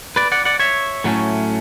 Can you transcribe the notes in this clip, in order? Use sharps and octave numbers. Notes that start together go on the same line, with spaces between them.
B4 D5
D5 F#5
D5 F#5
C#5 E5
A2 F#3 A3 C#4